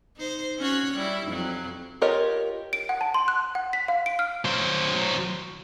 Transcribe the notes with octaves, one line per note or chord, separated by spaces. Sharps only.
D#4 C5
C#4 F#4 C#5
G3 E4
F2 F#3
F4 G4 A#4 C#5 D#5
D7
F#5
A5
C6
F#6
F#5
B6
F5
D7
F6
F#3 C5